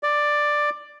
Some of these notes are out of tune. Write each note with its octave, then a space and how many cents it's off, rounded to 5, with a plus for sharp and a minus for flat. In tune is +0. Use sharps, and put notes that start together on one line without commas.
D5 +10